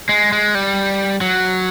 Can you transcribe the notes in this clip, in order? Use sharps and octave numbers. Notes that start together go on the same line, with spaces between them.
G#3
G#3
G3
F#3